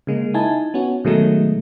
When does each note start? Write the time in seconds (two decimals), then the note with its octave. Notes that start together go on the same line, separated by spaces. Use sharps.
0.07 C#3 G#3 A#3
0.34 D#4 E4 G#5 A5
0.74 B3 C#4 F#4
1.05 B2 D#3 F#3 G#3 A3 D#4